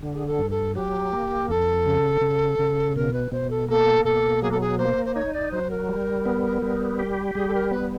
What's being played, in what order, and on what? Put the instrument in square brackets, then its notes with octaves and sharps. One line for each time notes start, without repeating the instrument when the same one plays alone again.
[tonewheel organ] D3
[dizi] G#4
A4
[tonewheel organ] G2
[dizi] A4
[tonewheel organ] F#3 [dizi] G4
[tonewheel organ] A#3
[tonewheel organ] F2 [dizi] A4
[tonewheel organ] C#3
C#3
C#3
[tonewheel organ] B2 [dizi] A#4
[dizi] B4
[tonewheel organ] B2 [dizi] C5
[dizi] A4
[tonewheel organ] A#3 [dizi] A4
[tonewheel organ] B2 [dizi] A4
[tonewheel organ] F#3 [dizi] G#4
[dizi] A4
G#4
[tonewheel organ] A#3 [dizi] C5
[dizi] C5
[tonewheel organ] D#4 [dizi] C#5
[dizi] D5
[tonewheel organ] F#3 [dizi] C5
[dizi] A#4
[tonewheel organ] G3
B3
G3
G4
[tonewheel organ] G3 [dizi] G#4
[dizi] A4
A#4
[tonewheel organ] B3 [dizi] B4